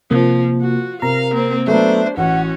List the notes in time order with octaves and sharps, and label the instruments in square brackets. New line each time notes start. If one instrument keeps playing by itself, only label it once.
[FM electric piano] C3 A#3 [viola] F3
[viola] F4 F#4
[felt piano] C3 [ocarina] A#4 [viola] F5 [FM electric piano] A#5
[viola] A#3 C4
[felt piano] F#3 A3 B3 [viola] D4 C5 [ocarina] E5
[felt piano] A1 [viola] C#4 F#4 [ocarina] F#5